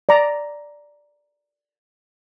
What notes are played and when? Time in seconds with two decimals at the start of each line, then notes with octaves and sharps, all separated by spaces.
0.09 D5 A#5